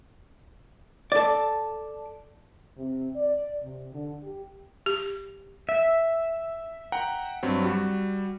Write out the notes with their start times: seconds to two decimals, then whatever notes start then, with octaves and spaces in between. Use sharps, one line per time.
1.12 A4 D5
2.77 C3
3.15 D5
3.63 C3
3.93 D3
4.23 G4
4.86 G4
5.69 E5
6.92 F#5 G5 A#5
7.43 G2 F#3 C4
7.63 G3 F#4